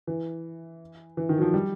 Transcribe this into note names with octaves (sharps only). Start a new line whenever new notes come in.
E3
E3
D#3
F#3
F3
G3